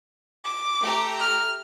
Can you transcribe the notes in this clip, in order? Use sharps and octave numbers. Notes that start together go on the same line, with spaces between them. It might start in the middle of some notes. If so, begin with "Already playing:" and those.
D6
A3 G4 A#5
F6